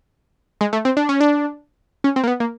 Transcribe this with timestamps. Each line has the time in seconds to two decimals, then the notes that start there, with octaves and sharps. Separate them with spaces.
0.61 G#3
0.73 A3
0.85 C4
0.97 D4
1.09 C#4
1.20 D4
2.04 C#4
2.16 C4
2.24 A#3
2.28 B3
2.40 A#3